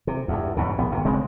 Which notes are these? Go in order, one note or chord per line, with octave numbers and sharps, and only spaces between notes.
C3
E2 G2
E2 G#2 C#3
A#1 B3
G#1 C3
C#3 G#3 C4